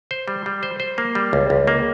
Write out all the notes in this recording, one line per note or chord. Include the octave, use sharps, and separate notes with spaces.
C5
G3
G3
C5
C5
A#3
G3
C#2
C#2
A#3